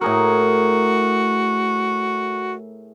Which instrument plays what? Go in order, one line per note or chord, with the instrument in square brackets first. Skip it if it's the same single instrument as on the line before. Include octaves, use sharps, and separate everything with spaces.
[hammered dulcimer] A2 G#4 A#4 [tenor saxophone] F#4